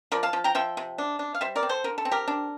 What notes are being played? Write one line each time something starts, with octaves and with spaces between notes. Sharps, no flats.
F3 A#4 D5
F5 A5
F3
G5 A#5
F3 E5 G5
C3
D4
D4
F5
G3 C5 E5
A#4 D5
C4
A4 C5
D3 A#4
A4
C4
G4 A#4
D4